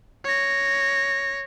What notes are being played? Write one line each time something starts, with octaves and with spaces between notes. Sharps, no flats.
C#5 A#6